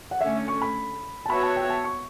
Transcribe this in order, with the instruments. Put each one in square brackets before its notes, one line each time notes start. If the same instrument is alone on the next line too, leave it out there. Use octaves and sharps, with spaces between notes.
[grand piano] F#5
[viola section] D3 A3 C#4 [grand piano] E5
[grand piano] C#6
B5
A5
[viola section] B3 F#4 C#5 E5 [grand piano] B5
[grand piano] A5
G5
A5
C#6